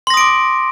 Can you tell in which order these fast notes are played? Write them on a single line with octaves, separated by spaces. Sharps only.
C6 A#6 D#6 D7 D6